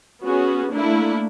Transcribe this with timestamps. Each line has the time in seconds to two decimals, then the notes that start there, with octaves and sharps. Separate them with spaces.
0.22 B3 C#4 F#4 G#4
0.73 A3 A#3 D4 E4